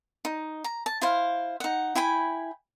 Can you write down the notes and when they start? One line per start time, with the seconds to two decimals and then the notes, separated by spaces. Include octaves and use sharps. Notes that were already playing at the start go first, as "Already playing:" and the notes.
0.25 D#4
0.64 A#5
0.86 A5
1.01 E4 C5 F5
1.60 D#4 F#5
1.95 E4 G5 G#5 B5